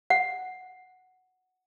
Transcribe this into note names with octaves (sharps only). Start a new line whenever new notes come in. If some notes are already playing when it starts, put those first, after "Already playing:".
F#5